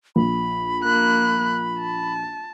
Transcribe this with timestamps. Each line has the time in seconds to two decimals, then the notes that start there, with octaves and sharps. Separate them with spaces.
0.16 A#1 B5
0.84 A#3 F#6
1.79 A5